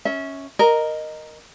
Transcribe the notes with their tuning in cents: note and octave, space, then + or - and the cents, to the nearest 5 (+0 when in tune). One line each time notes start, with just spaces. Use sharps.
C#4 +0 E5 -30
A#4 +0 D#5 -10